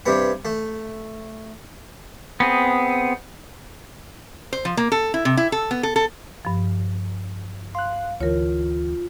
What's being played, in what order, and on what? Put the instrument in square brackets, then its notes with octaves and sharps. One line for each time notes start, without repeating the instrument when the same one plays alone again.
[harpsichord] G2 C3 B3
A3
[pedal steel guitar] B3 C4 G#4
[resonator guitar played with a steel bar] C5
F3
A#3
A4
E4
C3
E4
A4
B3
A4
A4
[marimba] G2 F3
[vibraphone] F5 [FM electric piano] C6 F#6
[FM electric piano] D2 E3 [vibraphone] F4 [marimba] A#4 C#5